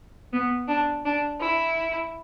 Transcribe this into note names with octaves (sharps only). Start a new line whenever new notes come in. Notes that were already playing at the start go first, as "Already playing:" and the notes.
B3
D4
D4
E4